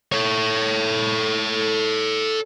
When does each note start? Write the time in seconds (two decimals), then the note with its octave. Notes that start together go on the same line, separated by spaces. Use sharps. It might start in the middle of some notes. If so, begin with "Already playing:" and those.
0.12 A4 C#5